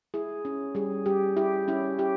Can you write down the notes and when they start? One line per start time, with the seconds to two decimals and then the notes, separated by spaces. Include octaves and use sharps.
0.14 E4 G#4
0.45 C#4
0.75 G3 G#4
1.06 G3 G4
1.37 E4 G4
1.68 C#4 E4
1.98 E4 G4